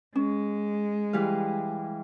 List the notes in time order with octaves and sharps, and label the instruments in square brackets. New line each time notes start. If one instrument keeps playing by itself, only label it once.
[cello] G#3 [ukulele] C#4
[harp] E3 G3 F5